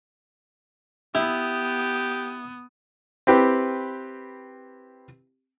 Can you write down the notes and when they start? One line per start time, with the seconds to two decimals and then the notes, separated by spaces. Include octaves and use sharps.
1.15 B3 E4 G4 D#6
3.27 C4 E4 G4 B4